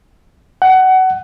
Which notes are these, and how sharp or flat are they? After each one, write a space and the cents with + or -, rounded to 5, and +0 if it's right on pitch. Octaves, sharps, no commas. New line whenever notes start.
F#5 +20